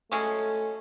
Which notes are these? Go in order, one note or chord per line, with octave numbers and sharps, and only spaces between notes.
F#3 G#3 A3 C#4